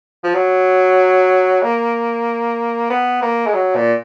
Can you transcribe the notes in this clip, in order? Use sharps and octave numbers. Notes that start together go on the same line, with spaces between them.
F3
F#3
A#3
B3
A#3
G#3
F#3
A#2